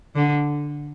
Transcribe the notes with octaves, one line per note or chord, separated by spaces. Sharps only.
D3